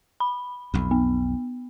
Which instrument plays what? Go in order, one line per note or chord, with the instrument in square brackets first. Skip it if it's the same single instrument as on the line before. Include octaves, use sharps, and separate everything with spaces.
[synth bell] B5
[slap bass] B1 F2
[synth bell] B3